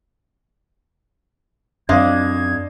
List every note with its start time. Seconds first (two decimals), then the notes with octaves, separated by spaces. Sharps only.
1.89 F#2 C4 D4 C5 D#5 F5 G#6